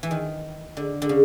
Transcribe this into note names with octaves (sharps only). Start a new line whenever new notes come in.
E3
D#3
D3
D3
C#3